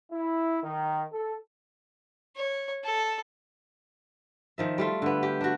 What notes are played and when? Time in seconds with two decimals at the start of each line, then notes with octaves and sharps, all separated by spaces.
0.11 E4
0.64 D#3
1.12 A4
2.36 C#5
2.84 A4
4.58 D#3 F3 E5
4.78 G3 A3 F4
5.02 D3 B3
5.23 G4
5.41 D4 F#4